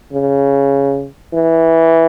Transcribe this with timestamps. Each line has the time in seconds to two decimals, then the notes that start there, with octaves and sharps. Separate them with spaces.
0.13 C#3
1.33 E3